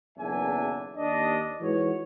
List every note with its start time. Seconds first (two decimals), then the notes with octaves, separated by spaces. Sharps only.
0.17 F#1 B1 E2 D4 E5 G#5
0.96 D#2 D4 D#5
1.61 G#2 E3 F#4 C#5